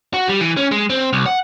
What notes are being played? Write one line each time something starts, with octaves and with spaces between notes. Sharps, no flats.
F#4
G3
E3
C#4
G#3
C4
C2
F#5